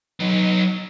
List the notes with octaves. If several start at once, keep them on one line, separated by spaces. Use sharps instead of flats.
F#3 D#4